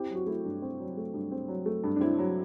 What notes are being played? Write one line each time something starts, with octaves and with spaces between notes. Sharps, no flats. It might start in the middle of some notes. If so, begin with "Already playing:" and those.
Already playing: C4 E4 G4
F#3 F#4
A3 E4
G2
C4
F#3
A3
G2
C4
F#3
A3
G2
D4
C4 E4
F#3